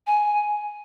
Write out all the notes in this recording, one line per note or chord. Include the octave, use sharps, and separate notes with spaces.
G#5